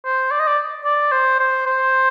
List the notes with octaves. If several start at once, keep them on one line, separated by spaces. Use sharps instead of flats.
C5
D5
D#5
D5
D5
C5
C5
C5